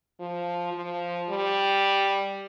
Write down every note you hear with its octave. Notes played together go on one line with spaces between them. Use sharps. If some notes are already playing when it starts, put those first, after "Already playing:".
F3
F3
G3